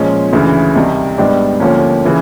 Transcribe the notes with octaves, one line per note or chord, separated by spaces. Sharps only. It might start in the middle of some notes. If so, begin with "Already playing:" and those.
Already playing: A#2 F3 G#3 C#4
D2 C#3 E3
C2 C3 D#3 G3
G#2 D#3 G3 B3 D4
D#2 D3 F3 A#3 C#4
C#3 E3